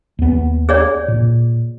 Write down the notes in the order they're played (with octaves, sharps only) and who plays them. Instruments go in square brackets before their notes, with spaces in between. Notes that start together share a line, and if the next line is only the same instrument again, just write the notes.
[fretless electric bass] D#2 B3
[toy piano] G#4 C#5 D5
[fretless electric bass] A#2